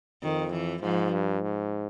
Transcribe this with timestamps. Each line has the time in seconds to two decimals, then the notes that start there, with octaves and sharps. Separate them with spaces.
0.22 F2 D#3
0.53 E3
0.82 G#2 F3
1.11 G2
1.42 G#2